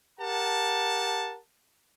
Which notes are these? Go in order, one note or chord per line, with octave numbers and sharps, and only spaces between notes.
G4 A#4 F#5 A5